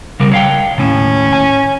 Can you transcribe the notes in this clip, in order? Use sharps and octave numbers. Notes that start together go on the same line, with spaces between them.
C#3 G3 A#4
C#5 F5 G5
D#2 A2 C3 C#4
G#5